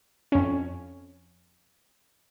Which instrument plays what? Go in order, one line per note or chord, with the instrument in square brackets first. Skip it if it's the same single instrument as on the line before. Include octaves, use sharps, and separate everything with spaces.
[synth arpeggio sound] F2 C#4